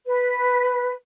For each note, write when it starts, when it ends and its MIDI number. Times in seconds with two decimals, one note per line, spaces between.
0.06 0.92 71